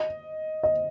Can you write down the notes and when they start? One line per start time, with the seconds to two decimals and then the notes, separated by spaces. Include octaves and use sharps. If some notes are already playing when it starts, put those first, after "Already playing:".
Already playing: D#5
0.63 D#5